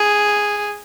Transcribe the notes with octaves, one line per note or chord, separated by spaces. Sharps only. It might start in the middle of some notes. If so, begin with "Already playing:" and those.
Already playing: G#4